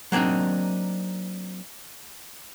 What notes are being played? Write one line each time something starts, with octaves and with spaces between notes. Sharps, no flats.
F#3 A#3 C4 D4 D#4